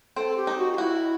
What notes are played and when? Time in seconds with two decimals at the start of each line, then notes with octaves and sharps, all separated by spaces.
0.16 C4 A4
0.37 G4
0.47 D#4
0.58 F#4
0.72 F4
0.78 E4 F#4